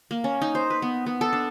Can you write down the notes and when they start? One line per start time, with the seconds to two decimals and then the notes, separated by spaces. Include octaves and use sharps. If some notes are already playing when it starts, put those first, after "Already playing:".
0.11 A#3
0.24 C#4
0.42 D#4
0.55 C5
0.70 B4
0.82 B3
1.06 B3
1.21 A4
1.33 D4